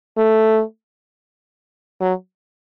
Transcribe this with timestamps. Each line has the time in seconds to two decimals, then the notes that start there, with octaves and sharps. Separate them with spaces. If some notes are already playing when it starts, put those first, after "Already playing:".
0.17 A3
2.01 F#3